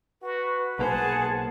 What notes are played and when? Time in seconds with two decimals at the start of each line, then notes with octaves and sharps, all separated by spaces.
0.22 F#4 B4
0.79 B1 A#3 G#4 C5 F#5 A5